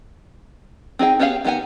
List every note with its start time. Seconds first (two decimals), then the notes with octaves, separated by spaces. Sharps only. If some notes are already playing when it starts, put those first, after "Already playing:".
0.99 C4 D#4 G#4 G5
1.20 B3 C#4 G4 G#4 F5
1.45 D#3 B3 G4 F#5 G#5